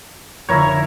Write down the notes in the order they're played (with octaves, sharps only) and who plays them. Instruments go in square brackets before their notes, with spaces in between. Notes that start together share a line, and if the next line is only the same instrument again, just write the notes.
[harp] F1 D3 [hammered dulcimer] E4 A#4 C#5